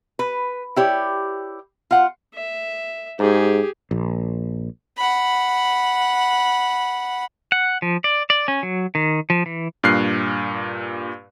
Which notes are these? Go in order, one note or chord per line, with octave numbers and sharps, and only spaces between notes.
B4
E4 G4 C#5 D5
F4 F#5
E5
G#2 G4 G#4
A#1
F#5 B5
F#5
F3
D5
D5
C#4
F#3
D#3
F3
E3
G2 A#2 F6 F#6 C7